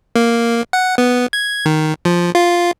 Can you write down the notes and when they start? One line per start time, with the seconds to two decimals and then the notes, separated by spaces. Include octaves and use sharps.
0.16 A#3
0.73 F#5
0.98 B3
1.33 G#6
1.66 D#3
2.05 F3
2.35 F4